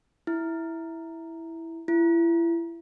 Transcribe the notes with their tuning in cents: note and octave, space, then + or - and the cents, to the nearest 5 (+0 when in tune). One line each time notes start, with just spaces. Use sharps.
E4 -5
E4 +30